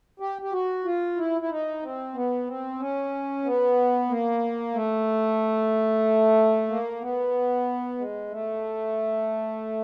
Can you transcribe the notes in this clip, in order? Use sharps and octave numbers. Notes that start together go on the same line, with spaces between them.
G4
G4
F#4
F4
E4
E4
D#4
C4
B3
C4
C#4
B3
A#3
A3
A#3
B3
G#3
A3